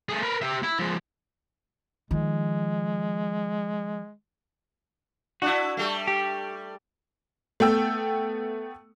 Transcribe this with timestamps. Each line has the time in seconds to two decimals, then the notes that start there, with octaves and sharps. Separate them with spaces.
0.09 A3 G#4
0.23 A#4 B4
0.42 G4 E5
0.63 E4
0.79 F3 G#3
2.11 D#3 F3 G#3
5.42 D4 E4 F#4
5.77 G3 A3
6.07 G4
7.60 A3 B3 G5 E6